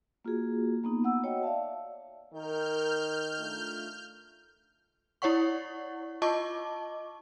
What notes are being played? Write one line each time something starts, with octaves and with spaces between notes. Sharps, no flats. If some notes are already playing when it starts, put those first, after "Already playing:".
A#3 F4 F#4 G#4
A#3 B3 D#4
B3 F#5 E6
F#4 C#5 D#5 G5
D5 E5 F5 A5
D#3 A#4 F6 G6
A3 D4 F4
E4 C#5 D5 F#5 C#6
F4 D#5 A5 C#6 D6